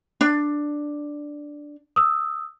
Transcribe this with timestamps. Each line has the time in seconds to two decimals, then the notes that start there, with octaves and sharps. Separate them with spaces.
0.21 D4
1.96 D#6 E6